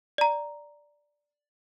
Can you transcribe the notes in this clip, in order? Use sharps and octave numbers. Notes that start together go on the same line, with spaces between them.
D5 A#5